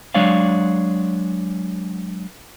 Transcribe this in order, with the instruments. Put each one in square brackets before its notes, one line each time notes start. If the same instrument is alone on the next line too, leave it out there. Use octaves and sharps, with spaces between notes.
[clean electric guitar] F#3 G#3 D4 C#5 D5 F5